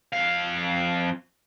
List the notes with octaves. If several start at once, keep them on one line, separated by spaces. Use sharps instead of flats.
F2 F5